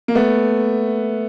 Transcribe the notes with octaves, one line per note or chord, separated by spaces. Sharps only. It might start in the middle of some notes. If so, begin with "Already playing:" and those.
A#3
A3 B3